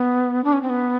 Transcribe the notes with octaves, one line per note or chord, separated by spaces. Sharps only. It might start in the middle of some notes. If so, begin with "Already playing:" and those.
Already playing: B3
D4
C#4
C4
B3